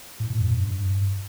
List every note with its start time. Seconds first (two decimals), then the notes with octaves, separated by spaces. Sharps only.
0.20 A2
0.30 A#2
0.40 F#2
0.50 G2